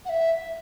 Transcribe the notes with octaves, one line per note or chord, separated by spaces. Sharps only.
F#5
E5